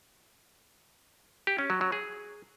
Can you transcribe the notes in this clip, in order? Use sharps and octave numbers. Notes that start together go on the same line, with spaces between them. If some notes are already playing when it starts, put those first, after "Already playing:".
G4
C#4
F#3
F#3
G#4